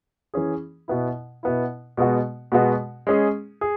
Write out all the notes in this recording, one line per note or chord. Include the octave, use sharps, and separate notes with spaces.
E3 C#4 G#4
B2 B3 E4
B2 B3 E4
B2 G#3 B3 F#4
B2 G#3 B3 F#4
G#3 C#4 G#4
G#4